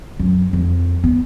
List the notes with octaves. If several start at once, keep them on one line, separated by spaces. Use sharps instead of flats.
F#2
F2
B3